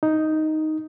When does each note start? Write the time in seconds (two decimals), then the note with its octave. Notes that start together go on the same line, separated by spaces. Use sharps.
0.03 D#4